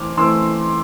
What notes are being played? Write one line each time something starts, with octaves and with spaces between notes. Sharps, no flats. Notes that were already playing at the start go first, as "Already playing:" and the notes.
Already playing: E3 A3 C4 D6 F6
E3 A3 C4 C6 E6